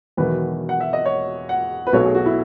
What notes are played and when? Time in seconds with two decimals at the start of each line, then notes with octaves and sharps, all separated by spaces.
0.17 E1 E2 D#3 F#3 B4
0.69 F#5
0.80 E5
0.93 D#5
1.06 C#5
1.49 F#5
1.87 B4
1.93 B1 B2 F#3 A3 C#5
2.05 G#4
2.15 F#4
2.26 E4